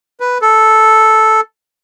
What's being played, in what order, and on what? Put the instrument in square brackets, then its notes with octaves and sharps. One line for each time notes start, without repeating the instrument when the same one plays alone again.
[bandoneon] B4
A4